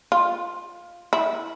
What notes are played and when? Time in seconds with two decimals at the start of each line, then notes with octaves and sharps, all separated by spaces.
0.12 F4
1.13 E4